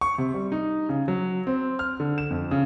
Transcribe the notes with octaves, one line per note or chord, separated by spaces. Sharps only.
C#6
C3
G3
D#4
C#3
F#3
C4
F6
D3
E7
F2
C#3